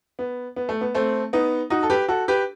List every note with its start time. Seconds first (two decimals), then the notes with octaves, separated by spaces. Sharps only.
0.19 B3
0.56 B3
0.69 A3
0.81 B3
0.95 A3 C4
1.33 B3 D#4
1.70 D#4 F#4
1.83 A4
1.90 G4 B4
2.09 F#4 A4
2.28 G4 B4